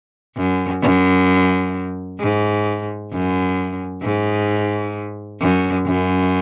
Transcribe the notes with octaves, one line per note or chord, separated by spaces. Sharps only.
F#2
F#2
G#2
F#2
G#2
F#2
F#2